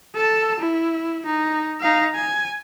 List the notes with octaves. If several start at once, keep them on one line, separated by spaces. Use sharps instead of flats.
A4 A5
E4
D#4
D#4 F5
G#5